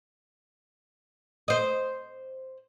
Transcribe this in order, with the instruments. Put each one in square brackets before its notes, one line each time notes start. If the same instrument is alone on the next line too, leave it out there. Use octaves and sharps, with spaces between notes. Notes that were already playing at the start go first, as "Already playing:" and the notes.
[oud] C5 D#5